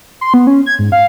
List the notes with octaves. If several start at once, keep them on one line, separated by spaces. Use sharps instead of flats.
C6
B3
C#4
G#6
G#2
F5